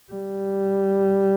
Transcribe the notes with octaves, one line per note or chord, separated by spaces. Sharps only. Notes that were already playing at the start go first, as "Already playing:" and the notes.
G3